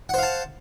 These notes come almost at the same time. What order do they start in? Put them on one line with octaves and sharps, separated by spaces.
F#5 C5 F5 A5